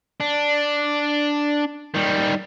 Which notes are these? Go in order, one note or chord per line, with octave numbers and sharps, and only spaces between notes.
D4
D#3 G3